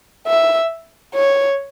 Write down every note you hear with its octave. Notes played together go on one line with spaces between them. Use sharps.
E5
C#5